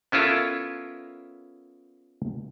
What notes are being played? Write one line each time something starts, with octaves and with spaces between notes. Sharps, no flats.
B3 C#4 E4 F4 A4 A#4